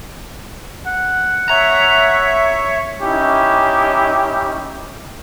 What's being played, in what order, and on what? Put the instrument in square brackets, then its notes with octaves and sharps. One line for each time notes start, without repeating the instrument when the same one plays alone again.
[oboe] F#5
[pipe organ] C#5 [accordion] E5 [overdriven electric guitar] A#5
[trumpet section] C#4 D#4 E4 G4